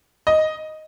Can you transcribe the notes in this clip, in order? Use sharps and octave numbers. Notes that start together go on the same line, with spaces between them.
D#5